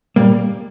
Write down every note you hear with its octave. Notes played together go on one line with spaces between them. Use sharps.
A#2 G3 A#3